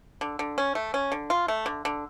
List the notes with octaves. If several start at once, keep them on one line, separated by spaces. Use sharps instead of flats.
D3
D3
C#4
A3
C#4
D3
F4
A3
D3
D3